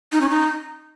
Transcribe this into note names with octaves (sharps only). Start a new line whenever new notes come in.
D#4
C#4
D#4